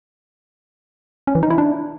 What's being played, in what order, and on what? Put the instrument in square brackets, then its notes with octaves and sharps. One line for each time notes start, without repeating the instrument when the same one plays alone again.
[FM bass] C#4
E3
D#4
E4
D4